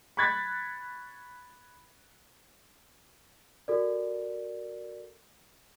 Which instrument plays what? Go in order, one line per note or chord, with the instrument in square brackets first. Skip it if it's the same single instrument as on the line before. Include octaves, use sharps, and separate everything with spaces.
[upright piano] B5 C#6 F#6 G#6 A6 B6
[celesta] F#4 A4 A#4 D5